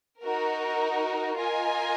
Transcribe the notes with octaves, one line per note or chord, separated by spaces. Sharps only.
D#4 F#4 A#4
F4 A#4 D#5 G#5